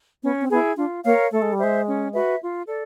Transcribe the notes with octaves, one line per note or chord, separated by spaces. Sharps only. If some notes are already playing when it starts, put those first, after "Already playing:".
B3 C#4
C4
B3 E4 G#4
D4 F4
A#3 A#4 C#5 F5
A3 A4
G#3
G3
G#3 C5 E5
C#4
F#4 B4 E5
F4
A4 D5